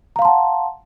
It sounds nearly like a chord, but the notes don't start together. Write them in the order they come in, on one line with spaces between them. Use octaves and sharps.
A#5 F5 C6 A5 F#5